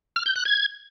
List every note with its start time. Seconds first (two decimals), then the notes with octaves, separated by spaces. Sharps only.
0.16 F6
0.26 G6
0.36 F#6
0.45 G#6